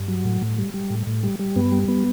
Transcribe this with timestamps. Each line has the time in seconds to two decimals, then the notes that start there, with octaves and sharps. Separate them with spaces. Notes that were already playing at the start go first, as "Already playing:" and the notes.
Already playing: G2
0.08 F#3
0.25 A2
0.42 A2
0.58 G3
0.74 G3
0.90 A2
1.07 A2
1.23 G3
1.39 G3
1.56 G2 B3
1.72 G3
1.88 B3